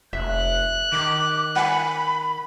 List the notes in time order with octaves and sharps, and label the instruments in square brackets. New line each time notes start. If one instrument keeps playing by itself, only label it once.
[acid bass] F1 [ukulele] E5 [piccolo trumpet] F#6
[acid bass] D#3 [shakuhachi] D6
[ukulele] F#5 G#5 [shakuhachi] B5